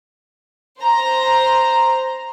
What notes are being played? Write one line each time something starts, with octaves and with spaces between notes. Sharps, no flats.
C5 A#5